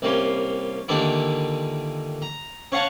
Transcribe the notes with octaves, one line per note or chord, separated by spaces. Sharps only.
C2 G3 A#3 C#4 C6
A#2 D3 D#3 G3 D4 E4
A#5
C#4 C#5 F5 F#5 A5 C#6